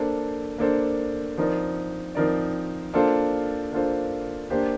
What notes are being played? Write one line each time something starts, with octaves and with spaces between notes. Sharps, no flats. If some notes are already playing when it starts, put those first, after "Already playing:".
Already playing: A#3 D4 A4 C5
A#3 D4 A4 C5
F3 C4 D#4 A#4 D5
F3 C4 D#4 A#4 D5
A#3 D4 F4 A4 C5
A#3 D4 F4 A4 C5
A#3 D4 G4 C5